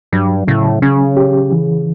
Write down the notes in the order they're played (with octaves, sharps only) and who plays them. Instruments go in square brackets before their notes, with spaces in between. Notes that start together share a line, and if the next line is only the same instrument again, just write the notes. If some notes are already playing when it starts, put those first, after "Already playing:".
[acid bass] G2 [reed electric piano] F#3
[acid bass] A2 [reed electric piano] C#3
[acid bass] C#3 [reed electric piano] C#4
[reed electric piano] G4
E3